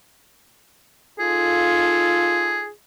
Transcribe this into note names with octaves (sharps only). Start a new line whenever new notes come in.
D#4 F4 G#4 A4